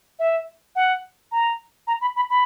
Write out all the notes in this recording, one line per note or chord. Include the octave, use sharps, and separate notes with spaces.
E5
F#5
A#5
A#5
B5
B5
B5